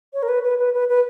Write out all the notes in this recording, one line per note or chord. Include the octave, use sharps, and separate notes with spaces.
C#5
A#4
B4
B4
B4
B4
B4